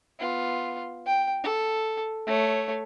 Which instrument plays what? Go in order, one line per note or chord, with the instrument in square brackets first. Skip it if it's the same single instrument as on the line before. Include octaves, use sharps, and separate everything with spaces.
[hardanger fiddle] B3 F4
G5
A4
A3 C#5